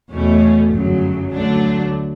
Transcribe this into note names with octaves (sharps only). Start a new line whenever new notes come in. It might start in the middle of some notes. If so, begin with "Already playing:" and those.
E2 B2 A3 C#4
G1 F#2 C#3 F#3
D2 D3 F#3 A3 D4